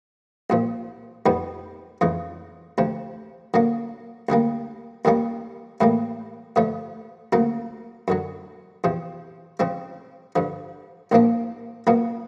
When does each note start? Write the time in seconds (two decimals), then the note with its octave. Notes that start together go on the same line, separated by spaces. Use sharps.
0.50 C2 A#2 F3
1.26 F2 C3 D#3 G3 B3
2.01 F2 C#3 E3 G#3
2.78 D2 C3 F3
3.54 D3 F#3 A#3 C#4
4.29 D2 D3 G3 A#3
5.05 D#2 D#3 G3 A#3 C#4
5.81 A2 E3 G3 A#3
6.56 G2 D3 F3 A3
7.32 D2 C#3 F#3 A#3
8.08 F#2 D3 F#3
8.84 E2 C3 F3
9.60 C#3 F3 G#3 C4
10.36 G2 D3 F3
11.12 C2 A#2 F3 A#3 D4
11.87 C#2 B2 F#3 A#3